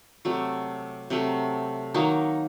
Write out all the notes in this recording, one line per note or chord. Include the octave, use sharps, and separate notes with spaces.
C3 F#3 A3
C3 F#3 A3
D#3 F#3 A#3 D#4